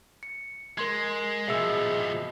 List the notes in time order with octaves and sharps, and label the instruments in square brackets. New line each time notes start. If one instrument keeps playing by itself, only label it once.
[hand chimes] C#7
[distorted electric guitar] G#3 [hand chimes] A#4 C6 G#6
[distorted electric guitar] B2 F3 [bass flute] G#4 [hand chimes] D#5 E5 E6